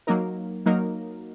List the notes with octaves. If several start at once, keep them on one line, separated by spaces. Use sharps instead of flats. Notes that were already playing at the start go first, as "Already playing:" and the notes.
F#3 A#3 D#4 A#4
F#3 A#3 D#4 A#4